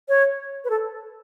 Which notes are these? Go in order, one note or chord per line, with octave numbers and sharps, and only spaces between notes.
C#5
B4
A4